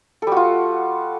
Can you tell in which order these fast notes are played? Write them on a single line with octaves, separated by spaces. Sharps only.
A4 G3 F#4 F4